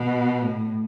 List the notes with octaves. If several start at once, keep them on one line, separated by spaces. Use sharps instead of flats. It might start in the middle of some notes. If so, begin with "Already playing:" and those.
Already playing: B2
A2